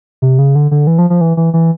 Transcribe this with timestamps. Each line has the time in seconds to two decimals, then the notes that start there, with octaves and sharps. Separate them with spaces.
0.22 C3
0.39 C#3
0.55 D3
0.71 D3
0.87 E3
0.98 F3
1.10 F3
1.21 E3
1.37 E3
1.54 E3